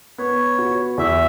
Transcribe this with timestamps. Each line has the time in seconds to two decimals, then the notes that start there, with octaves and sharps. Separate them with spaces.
0.18 B3 C#5
0.58 F#4
0.98 E2 E5